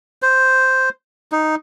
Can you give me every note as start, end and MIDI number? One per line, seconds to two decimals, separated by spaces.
0.22 0.89 72
1.32 1.55 63